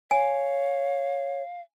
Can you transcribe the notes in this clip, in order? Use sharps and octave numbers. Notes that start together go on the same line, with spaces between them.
C#5 F5 G#5